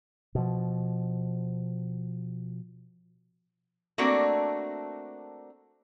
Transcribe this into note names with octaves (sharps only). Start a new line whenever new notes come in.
B2 F3
A3 A#3 C4 D4 F#4